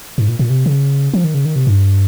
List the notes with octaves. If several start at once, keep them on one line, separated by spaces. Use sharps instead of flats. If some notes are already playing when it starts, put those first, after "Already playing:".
G#2
A#2
A#2
C3
C#3
F3
D#3
C#3
D#3
C3
G2